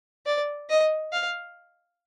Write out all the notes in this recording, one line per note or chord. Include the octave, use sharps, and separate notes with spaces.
D5
D#5
F5